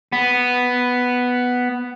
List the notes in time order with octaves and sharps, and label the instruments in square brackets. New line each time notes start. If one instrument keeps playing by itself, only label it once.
[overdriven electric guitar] B3